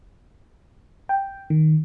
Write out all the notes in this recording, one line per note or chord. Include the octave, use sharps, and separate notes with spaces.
G5
D#3